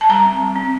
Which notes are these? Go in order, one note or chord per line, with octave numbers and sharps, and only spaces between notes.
A5
G3 A#5
C4
G3
C4